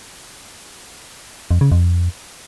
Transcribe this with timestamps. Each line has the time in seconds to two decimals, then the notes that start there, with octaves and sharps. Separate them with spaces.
1.51 F2
1.61 C#3
1.72 F2